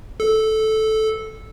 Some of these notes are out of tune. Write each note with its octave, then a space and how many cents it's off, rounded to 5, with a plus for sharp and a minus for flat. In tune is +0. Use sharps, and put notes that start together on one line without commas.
A4 -10